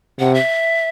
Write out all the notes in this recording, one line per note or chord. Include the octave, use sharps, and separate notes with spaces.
C3 F#5
E5